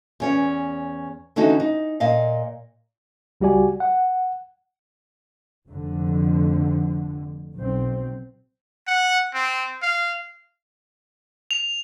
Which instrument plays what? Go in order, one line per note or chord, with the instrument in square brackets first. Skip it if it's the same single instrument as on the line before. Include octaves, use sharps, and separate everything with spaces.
[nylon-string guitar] E2 C#4 C#5
D3 E3 C#4 D#4 F#4 A4
D#4
A#2 D#5 F5
[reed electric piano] C#2 G3 F#4 G4 D5 G#5
F#5
[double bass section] F1 F2 D3
B1 C4
[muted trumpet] F#5
C4
F5
[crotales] F7